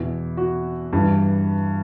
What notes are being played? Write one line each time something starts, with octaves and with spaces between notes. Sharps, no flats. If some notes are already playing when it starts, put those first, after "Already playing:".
Already playing: E2 B2 E4
F#4
G2 E3